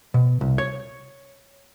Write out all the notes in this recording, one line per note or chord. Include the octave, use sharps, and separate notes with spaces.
B2
C2
C#5